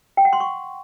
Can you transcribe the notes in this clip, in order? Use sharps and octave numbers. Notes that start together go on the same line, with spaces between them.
G5
F#5
C6
C#6